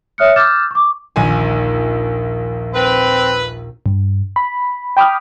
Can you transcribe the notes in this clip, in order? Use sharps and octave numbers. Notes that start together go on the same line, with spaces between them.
C#5 E5 D#6 F6 F#6 C#7
D6 E6 F6 G6 A6 E7
C#6 D6
A#1 D#2 A#2 G#5
C4 B4
G2
B5
G5 B5 D6 D#6 F6